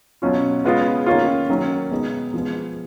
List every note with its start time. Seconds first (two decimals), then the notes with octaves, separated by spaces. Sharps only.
0.22 B2 F#3 C#4 F4
0.64 C#3 G#3 B3 F4
1.06 D#3 A#3 C#4 F4
1.50 D#3 F#3 A#3 C#4
1.91 B2 G#3 B3 D#4
2.34 F3 G#3 B3